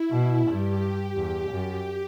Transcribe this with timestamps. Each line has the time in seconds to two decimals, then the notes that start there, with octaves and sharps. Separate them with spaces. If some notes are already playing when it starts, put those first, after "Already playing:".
Already playing: E4
0.10 B2
0.46 G2 G4
1.16 E2
1.50 F#2